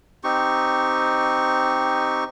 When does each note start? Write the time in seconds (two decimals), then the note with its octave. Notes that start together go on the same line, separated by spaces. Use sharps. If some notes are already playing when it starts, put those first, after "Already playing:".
0.24 C4 D#4 G4 C#6